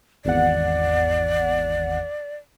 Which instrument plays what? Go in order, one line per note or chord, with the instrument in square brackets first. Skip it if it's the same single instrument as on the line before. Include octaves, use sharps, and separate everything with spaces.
[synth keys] G#1 E2 F#5 [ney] D5